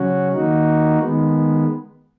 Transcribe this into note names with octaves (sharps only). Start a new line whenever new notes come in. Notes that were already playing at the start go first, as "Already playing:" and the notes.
Already playing: C#3 F#3 C#4 F#4
D#3 A#3 D#4 F#4
D#3 G#3 B3